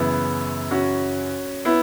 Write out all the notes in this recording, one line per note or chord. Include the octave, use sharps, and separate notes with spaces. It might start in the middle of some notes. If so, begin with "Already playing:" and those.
Already playing: F#2 C#3 E3 B3 E4
C#4 F#4
B3 E4